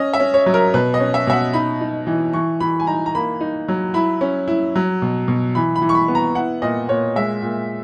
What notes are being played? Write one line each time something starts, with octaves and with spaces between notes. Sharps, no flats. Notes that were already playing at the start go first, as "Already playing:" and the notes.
Already playing: C#4 D#5
E5
C#4
C#5
F#3
A#4
B2 B4
D#5
C#4
E5
B2 E5
F#5
D#4 B5
D#4
E3
E3 C#6
E3 B5
G#5
D#4 A#5
A#5
A#3 B5
D#4
F#3
E4 B5
C#4
E4
F#3
B2
B2
E3 B5
B5
E3
C#6
B5
B3
A#5
E4 F#5
A#2 D#5
A#2 C#5
G#3 E5
A#2